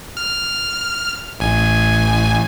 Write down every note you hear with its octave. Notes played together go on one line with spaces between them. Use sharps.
F6
A1 G#5